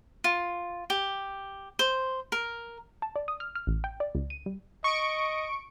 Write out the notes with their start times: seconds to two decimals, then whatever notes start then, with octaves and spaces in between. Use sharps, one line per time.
0.24 F4
0.90 G4
1.79 C5
2.32 A#4
3.02 A5
3.16 D5
3.28 D#6
3.40 F6
3.55 F6
3.67 A1
3.84 G5
4.00 D5
4.15 C#2
4.30 D#7
4.46 G3
4.84 D#5 C#6 D7